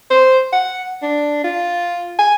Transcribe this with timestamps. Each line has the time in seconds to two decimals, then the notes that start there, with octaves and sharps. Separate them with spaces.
0.11 C5
0.53 F#5
1.03 D4
1.44 F4
2.19 G#5